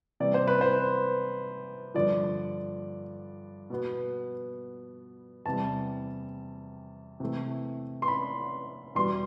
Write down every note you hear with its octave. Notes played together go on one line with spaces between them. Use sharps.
C3 E3 G3 D5
C5
B4
C5
G2 D3 F3 D5
B2 B3
E2 C3 G3 A5
C3 E3 A3
C6
B5
E2 B2 G3 C6